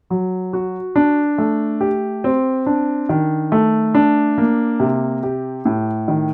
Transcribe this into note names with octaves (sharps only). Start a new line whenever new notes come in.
F#3
F#4
D4
A3
G4
C4
D4
D#3
A3
D4
A#3
C3
G4
A2
D#3